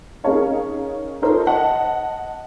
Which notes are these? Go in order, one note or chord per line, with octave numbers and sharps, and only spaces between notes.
C#4 D#4 G#4 A#4 C#5 F5
D#4 F4 A4 A#4 C5 C#5
D#5 F#5 A5